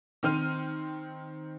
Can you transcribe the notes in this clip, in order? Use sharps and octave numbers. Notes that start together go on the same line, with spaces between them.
D#3 C4 C5 F6 D#7